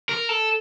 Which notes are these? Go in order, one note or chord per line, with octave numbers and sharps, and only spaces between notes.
A#4
A4